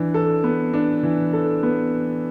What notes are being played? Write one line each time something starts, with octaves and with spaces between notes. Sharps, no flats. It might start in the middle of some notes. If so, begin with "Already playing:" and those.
Already playing: E3 D4
A4
B3
D4
E3
A4
B3